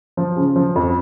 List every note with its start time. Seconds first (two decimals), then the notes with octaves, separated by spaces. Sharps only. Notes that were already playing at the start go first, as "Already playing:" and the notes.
0.17 F3
0.36 C#3
0.56 F3
0.76 F2